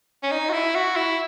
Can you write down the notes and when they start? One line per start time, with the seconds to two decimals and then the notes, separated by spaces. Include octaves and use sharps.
0.23 C#4
0.32 D#4
0.50 F#4
0.53 E4
0.75 F#4
0.96 E4